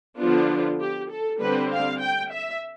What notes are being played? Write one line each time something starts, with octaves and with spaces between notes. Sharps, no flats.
D3 F3 B3 D4 F4
G4
A4
D3 G3 C4 B4
F5
G5
E5